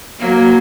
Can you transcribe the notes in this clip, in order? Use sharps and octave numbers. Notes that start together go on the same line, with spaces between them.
F#3 A#3